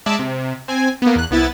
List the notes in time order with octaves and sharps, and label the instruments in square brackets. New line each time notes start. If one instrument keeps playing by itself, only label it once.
[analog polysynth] G#3 D5 E5 A5
C3
C4 G#5
A#3 B3
E2 F#6
C2 B3 E4 A6